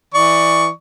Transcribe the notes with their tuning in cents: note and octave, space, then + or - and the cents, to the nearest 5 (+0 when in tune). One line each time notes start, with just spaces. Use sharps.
E3 +0 D5 +15 C#6 +10